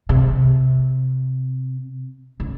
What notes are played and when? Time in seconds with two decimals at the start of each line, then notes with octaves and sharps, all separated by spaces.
0.09 C3
2.40 C#3